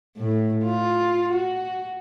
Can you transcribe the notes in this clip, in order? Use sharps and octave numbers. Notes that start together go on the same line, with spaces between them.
A2
F4
F#4